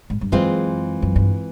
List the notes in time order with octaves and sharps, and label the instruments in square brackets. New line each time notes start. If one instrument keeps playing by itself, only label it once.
[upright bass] G#2
G2
[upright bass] F#2 [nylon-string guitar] E3 G#3 C4 F4
[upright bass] F#2
G2